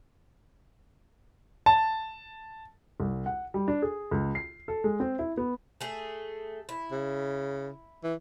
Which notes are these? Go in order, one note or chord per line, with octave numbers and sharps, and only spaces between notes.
A5
C2
F#5
G3
D4
G#4
C#2
C7
A4
G#3
C4
E4
B3
A3 G#4
E4
C#3
E3